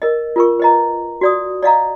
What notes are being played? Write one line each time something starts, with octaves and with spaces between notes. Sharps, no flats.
A#4 D#5
F4 A#4 C#6
B4 D#5 A#5
F#4 D5 D#6
D5 D#5 F5 A#5